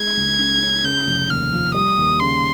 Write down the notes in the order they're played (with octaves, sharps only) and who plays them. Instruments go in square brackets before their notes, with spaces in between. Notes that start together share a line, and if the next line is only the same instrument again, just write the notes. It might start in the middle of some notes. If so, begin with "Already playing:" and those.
Already playing: [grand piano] G#3 [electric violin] G#6
[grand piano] C#2
C#3
C#4
[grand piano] C#3 [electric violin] G6
[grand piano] F1
[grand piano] D#2 [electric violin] F6
[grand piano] F3
[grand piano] G3 [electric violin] D#6
[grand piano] D#2
[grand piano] C#3 [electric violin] C6